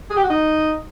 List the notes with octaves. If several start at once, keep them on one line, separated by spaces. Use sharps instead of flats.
G#4
G4
F#4
D#4